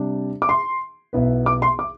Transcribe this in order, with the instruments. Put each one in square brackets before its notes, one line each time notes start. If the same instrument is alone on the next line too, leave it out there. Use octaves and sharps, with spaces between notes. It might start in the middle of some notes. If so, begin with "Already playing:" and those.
Already playing: [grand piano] C3 G3 D4
[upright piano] D6
C6
[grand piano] B1 B2 B3 E4 B4
[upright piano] D6
C6
D6